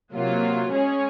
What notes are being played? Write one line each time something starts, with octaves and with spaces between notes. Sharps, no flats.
C3 F#3 A#3 F4
G#3 C#4 G#4 C#5